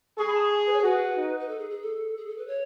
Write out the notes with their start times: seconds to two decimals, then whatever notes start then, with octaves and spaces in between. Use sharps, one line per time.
0.18 G#4 C#6
0.27 B5
0.34 A5
0.42 C#6
0.66 B4
0.73 C#5
0.79 A4
0.83 F#4 B4
1.17 D#4
1.40 B4
1.49 A4
1.59 G#4
1.70 G#4
1.82 A4
2.17 G#4
2.28 A4
2.38 B4
2.47 C#5